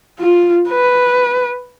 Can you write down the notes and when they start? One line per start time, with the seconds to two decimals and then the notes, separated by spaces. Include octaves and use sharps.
0.19 F4
0.69 B4